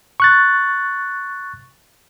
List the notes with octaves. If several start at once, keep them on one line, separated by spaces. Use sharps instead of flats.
C#6 F#6 A6